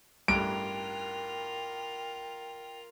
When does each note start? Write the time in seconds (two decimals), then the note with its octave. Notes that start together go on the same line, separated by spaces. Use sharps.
0.28 A1 G2 F4 A#4 G5 D7